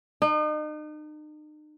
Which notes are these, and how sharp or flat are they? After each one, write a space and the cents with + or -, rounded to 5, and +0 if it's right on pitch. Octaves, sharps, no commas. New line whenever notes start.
D#4 -40